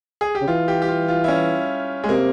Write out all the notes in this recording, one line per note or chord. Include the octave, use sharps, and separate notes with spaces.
G#4
G4
C#3
E3 F4
G4
G4
F4
F4
E4
C#4
G#3
C3 A#3